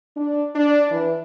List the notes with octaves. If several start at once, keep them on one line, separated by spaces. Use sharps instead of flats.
D4
D4
E3